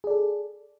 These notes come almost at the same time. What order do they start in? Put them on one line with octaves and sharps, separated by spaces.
G#4 D5 A4